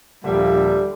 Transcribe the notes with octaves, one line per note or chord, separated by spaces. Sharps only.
A#1 D#2 D3 G3 A#3 E5